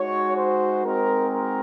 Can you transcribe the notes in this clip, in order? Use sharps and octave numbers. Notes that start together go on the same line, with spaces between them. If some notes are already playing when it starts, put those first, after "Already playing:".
Already playing: G#3 D#4 F#4 C#5
C5
G#3 C4 D#4 F#4 A#4
A#4